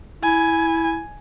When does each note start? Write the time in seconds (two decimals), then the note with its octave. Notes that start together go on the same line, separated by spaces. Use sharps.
0.23 E4 G#5